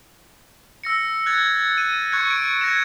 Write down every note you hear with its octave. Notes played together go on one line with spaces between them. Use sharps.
E6 A#6 C#7
F#6 G#6 A6
D#7
C#6 F#6 G#6 C#7
D7
G#6 A#6 C#7 E7